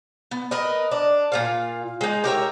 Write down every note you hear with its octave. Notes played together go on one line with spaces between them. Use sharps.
B3
A#4 B4 D#5
D4
A#2 F4 F5
G#3 D#4
G4 A#4 C#5 E5